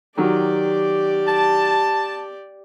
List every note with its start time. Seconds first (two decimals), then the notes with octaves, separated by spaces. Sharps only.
0.17 D#3 F#3 G4 D5
1.28 A5